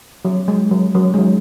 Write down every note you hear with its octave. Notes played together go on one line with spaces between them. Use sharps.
F#3
G#3
F#3
F#3
G#3
F#3